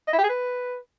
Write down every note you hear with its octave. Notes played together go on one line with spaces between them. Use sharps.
D#5
E4
G4
G#4
B4